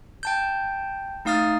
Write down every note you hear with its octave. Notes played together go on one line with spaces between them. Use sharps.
G5 A5 G6
A3 D#4 F5 D#6 F6 A6